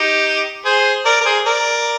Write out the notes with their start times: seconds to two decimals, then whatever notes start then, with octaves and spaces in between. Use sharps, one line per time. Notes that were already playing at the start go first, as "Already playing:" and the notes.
Already playing: D#4 G4
0.65 G#4 C5
1.05 A#4 D5
1.21 A#4
1.25 G#4 C5
1.45 A#4 D5